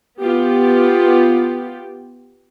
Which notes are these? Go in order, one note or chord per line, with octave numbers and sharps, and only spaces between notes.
B3 F4 G4